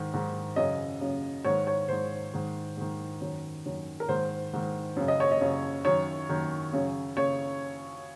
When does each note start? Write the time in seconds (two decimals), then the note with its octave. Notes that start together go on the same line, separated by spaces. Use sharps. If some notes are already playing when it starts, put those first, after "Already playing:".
Already playing: G#2 D#3
0.13 G#2 D#3
0.56 F#2 C#3 D#5
1.01 F#2 C#3
1.45 G#2 D#3 C#5
1.67 C#5
1.89 G#2 D#3 C5
2.34 G#2 D#3
2.77 G#2 D#3
3.21 F#2 D#3
3.65 F#2 D#3
4.00 A#4
4.08 G#2 D#3 C5
4.53 G#2 D#3
4.96 F#2 C#3
5.08 D#5
5.20 C#5
5.31 D#5
5.41 F#2 C#3
5.85 F#2 D#3 C#5
6.29 F#2 D#3
6.73 F#2 C#3
7.17 C#3 C#5